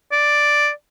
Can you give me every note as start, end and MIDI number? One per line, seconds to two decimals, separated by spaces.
0.12 0.70 74